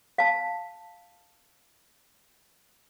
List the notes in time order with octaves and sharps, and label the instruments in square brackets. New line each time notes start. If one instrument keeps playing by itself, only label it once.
[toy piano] F5 A5